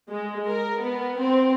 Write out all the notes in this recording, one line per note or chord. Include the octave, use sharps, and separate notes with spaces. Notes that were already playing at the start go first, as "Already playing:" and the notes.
G#3
A#4
B3
C4